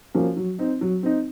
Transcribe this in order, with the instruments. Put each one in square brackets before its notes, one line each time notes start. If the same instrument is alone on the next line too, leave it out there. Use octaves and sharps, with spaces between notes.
[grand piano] F3 A#3 C#4 F#4
F#3
C4 D#4
F#3
C4 D#4